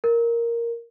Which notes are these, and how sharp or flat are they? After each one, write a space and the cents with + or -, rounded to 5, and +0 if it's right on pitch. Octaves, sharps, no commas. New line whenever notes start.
A#4 +0